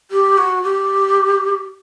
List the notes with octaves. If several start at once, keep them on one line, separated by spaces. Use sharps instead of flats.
G4
F#4
G4